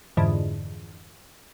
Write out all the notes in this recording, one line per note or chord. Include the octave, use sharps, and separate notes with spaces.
F2 G#2 D3 E3